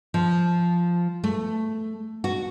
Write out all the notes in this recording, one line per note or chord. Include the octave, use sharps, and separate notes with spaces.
F3
A3
F#4